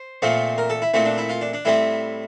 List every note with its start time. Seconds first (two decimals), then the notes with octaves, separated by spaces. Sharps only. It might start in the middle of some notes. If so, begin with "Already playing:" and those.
Already playing: C5
0.22 A#2 F3 A3 C4
0.58 A#4
0.70 A4
0.82 E4
0.94 A#2 A3 C4 E4
1.06 D4
1.18 E4
1.29 F4
1.41 D4
1.54 D4
1.65 A2 G3 C4 E4